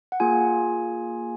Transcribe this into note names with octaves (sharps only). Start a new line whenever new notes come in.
F#5
A#3 F4 G#4 G#5